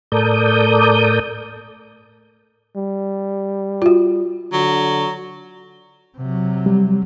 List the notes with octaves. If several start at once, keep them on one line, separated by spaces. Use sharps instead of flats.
A2 A4 A#4 D5 D#6 G6
G3
F4 F#4
D3 F#3
C3 F#3
G3